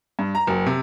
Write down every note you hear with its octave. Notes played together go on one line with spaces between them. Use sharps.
G2
A#5
F#1
C3